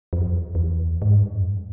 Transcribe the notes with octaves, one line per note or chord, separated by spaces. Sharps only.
F2
E2
G#2
G2
F#2
F2